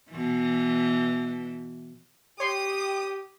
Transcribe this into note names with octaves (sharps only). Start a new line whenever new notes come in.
B2 E3
G4 C#5 G5 C6 D#6